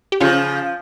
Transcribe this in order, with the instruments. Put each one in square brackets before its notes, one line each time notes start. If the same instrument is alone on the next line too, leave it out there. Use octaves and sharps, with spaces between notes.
[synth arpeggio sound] G4
[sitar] C#3 F3 [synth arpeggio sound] C#4 F4